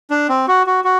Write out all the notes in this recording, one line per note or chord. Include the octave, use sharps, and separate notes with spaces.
D4
C4
F#4
F#4
F#4